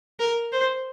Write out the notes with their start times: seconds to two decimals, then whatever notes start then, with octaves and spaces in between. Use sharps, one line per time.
0.20 A#4
0.52 C5